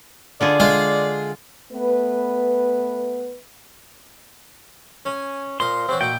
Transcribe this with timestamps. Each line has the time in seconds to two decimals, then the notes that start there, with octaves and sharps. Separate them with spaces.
0.41 D3 F4 G#4 D5
0.60 G#3 F4
1.73 A3 B3 B4
5.06 C#4 G#5
5.60 A#2 C5 D#5 F5 C6
5.89 E3 C4 C#4 F#4
6.01 A#2 D#4 E4 F#4 G5